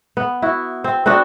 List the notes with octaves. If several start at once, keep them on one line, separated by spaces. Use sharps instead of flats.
B3
E4 F#4
C4
B3 C4 D4 F#4